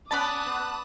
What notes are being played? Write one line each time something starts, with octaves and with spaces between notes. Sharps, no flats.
B3 C#4 D5 A5 B5 D6 D#6 F#6
B3